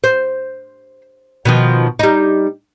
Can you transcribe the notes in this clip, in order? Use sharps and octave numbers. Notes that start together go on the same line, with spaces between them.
C5
B2 D#3 F3
G3 D#4